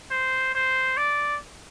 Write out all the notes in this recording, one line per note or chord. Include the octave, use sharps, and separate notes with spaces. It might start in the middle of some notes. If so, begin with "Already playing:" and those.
C5
C5
D5